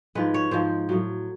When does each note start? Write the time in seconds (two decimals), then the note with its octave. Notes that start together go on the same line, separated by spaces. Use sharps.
0.15 G#2 F3 G#3 B4
0.34 C#5
0.51 G#2 F3 G#3 C5
0.89 A2 F#3